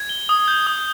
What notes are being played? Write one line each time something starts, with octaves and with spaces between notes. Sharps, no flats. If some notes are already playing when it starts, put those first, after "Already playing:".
Already playing: G#6
G7
D#6
G6
D#6